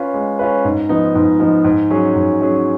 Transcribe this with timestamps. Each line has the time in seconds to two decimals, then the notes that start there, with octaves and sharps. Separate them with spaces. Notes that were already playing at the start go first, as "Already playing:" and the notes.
Already playing: C#4 F4 B4
0.14 G#3
0.39 C#4 F4 B4
0.65 G#2
0.89 F3 B3 D#4
1.15 G#2
1.40 F3 B3 D#4
1.65 G#2
1.91 F#3 C#4 G#4
2.15 G#2
2.41 F#3 C#4 G#4